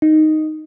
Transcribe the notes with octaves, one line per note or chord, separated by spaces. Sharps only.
D#4